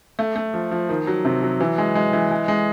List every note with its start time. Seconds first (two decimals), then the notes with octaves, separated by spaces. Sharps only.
0.19 A3
0.36 A3
0.54 F3
0.71 F3
0.89 D#3
1.07 F#3
1.25 C3
1.43 F#3
1.60 E3
1.78 G#3
1.95 G#3
2.13 E3
2.31 G#3
2.48 G#3